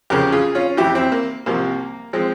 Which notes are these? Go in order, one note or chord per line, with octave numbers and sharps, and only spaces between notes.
E2 C#3 F3 G4 A#4
F4 G#4
C#4 F4
F2 E3 E4 G4
C4 E4
A#3
C2 C3 F3 A#3
F3 G#3 C4